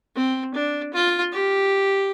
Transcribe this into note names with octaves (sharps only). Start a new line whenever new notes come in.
C4
D4
F4
G4